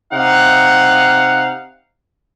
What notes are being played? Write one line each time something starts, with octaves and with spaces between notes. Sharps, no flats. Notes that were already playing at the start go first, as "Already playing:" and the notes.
C3 D#4 F5 F#5